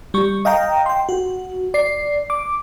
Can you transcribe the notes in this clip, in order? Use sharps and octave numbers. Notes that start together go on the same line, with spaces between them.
G3 C#6
D#5 F5 G5 A#5
G5 C6
F#4
D5 C7
D6